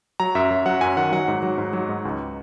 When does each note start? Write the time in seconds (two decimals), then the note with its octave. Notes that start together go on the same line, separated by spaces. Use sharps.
0.20 F#3 A#5
0.35 F#2 E5
0.51 F#2
0.66 F#3 F#5
0.81 F#2 G#5
0.97 D#3 F#5
1.12 F#3 F#5
1.28 G#2
1.43 F#3
1.58 G#2
1.73 F#3
1.89 G#2
2.05 C#2